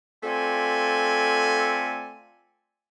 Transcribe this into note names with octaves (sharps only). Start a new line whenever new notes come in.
A3 C4 F4 A4 D5 G#5